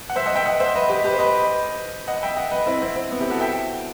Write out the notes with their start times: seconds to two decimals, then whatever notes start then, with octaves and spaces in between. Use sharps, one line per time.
0.10 F#5
0.16 C5 E5
0.26 D#5 F#5
0.36 E5 G5
0.45 D#5 F#5
0.60 C5 E5
0.75 B4 D#5
0.89 G4 B4
1.04 G4 B4
1.13 C5
1.19 B4 D#5
2.08 D#5 F#5
2.22 E5 G5
2.37 D#5 F#5
2.51 B4 D#5
2.66 C4 E4
2.82 C4 E4
2.96 C4
3.12 B3
3.20 E4 G4
3.30 F#4 A4
3.40 E5 G5